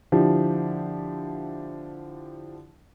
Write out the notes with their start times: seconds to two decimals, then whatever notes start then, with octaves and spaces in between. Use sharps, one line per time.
0.12 D3 F3 E4 G4